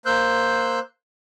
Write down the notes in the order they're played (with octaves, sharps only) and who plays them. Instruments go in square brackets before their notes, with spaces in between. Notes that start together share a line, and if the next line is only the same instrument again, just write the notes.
[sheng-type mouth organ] A#3 C5 E6 F#6 G6